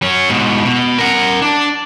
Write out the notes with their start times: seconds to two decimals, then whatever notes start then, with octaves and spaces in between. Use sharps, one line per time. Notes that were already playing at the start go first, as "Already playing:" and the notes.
0.02 F#3 C#4
0.30 G#2 B2
0.65 B2
0.98 A#4 F#5
1.42 D4